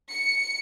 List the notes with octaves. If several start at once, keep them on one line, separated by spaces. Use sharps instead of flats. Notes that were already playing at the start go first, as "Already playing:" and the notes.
C#7